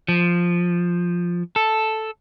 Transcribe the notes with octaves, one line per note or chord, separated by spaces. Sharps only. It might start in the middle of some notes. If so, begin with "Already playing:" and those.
F3
A4